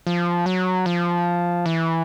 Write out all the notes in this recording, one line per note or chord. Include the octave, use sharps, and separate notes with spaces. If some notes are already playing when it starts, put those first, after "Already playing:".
F3
F#3
F3
E3